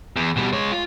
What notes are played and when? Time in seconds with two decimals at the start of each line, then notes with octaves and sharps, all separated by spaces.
0.16 E2
0.36 B2 G3
0.53 G#3 C#5
0.72 F4